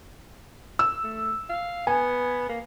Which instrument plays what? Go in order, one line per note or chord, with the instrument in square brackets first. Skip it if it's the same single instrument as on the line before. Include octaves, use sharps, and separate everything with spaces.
[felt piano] E6
[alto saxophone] A3
F5
[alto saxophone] B3 [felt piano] G#5
[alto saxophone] A#3